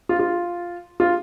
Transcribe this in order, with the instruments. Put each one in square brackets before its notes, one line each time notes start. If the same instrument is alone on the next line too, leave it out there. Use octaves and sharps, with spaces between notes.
[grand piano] F4
F4
F4